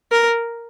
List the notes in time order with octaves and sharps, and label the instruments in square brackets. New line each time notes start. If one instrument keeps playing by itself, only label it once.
[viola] A#4